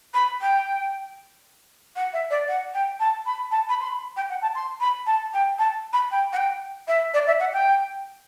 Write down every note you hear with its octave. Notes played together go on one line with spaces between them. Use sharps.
B5
G5
F#5
E5
D5
F#5
G5
A5
B5
A5
B5
C6
B5
G5
F#5
A5
C6
B5
A5
G5
A5
B5
G5
F#5
G5
E5
D5
E5
F#5
G5